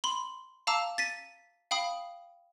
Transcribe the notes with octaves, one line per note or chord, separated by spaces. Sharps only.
B5 C6
F5 A5 A#5 D6 E6
A6 B6 D#7
F5 G5 B5 D#6